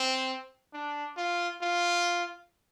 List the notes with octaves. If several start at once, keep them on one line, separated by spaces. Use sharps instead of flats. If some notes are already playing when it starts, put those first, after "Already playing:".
Already playing: C4
D4
F4
F4